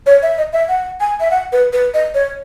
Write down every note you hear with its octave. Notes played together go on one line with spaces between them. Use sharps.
C#5
E5
D#5
E5
F#5
G#5
E5
F#5
B4
B4
D#5
C#5